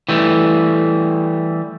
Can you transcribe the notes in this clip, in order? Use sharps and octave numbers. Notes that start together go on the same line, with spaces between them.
E3 G3 A3